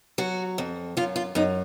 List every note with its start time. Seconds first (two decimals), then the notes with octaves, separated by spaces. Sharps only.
0.18 F#3 F#4
0.58 F2
0.97 F#2 F4
1.16 F4
1.35 F#2 D#4